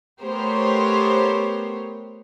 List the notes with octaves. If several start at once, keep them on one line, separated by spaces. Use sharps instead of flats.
A3 B3 G4 A#4 C5 C#5